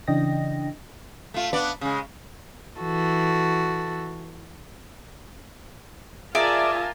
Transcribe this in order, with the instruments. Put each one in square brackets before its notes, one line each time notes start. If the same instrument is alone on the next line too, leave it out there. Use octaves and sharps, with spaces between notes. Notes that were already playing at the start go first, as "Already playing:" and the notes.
[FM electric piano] C#3 E3 D4 D#5 G5 A#6
[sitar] A3 F4
B3 D4 D5
C#3 G#3
[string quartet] E3 F#4 A4
[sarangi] F4 [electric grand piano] G#4 E5 [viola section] A#4 G#5 A5 [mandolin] D5